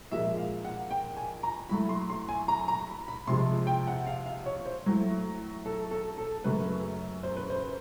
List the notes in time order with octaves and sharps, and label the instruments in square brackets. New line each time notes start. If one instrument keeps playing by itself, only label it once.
[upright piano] A#2 F3 G#3 E5
F5
F#5
G5
G#5
A#5
A2 F#3 A3 B5
C6
C6
G#5
A#5
A#5
B5
B5
C3 F3 G#3 C6
G5
F#5
F5
F5
C#5
C5
A2 F#3 A3
A4
A4
A4
F#2 C#3 F#3 A3 B4
C5
B4
C5